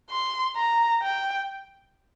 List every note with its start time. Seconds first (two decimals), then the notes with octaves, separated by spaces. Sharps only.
0.10 C6
0.56 A#5
1.02 G5